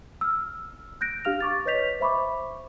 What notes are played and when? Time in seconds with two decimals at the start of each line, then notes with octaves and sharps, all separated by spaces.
0.21 E6 F6
1.01 F#6 G6 A#6 D7
1.25 D4 G4 F5 F6 F7
1.41 C#6 D6 A6
1.65 B4 C#5 D#5 G6 B6 F7
2.00 C5 E5 B5 C#6 D6